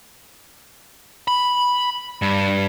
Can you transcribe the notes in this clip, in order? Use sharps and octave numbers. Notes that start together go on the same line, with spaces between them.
B5
G2